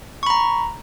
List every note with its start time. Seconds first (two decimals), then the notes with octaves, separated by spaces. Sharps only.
0.23 C#6
0.26 B5
0.30 A#5